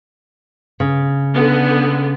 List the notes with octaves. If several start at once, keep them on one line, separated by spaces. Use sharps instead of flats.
C#3
D3 B3